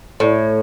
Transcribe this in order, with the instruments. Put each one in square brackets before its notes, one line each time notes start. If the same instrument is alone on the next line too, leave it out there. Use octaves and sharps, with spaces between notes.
[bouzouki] A2